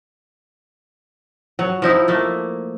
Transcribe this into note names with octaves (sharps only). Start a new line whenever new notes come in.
F#3
F3 D#4 E4
A3 A#3